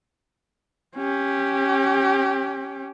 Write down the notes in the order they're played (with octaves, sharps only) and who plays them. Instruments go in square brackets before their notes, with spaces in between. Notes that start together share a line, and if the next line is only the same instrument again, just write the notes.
[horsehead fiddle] C#4 G4